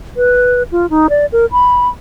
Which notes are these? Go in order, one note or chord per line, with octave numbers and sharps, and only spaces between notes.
B4
F4
D#4
D5
A#4
B5